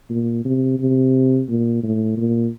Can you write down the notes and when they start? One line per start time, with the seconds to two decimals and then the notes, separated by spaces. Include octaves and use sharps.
0.10 A#2
0.45 C3
0.79 C3
1.48 A#2
1.83 A2
2.17 A#2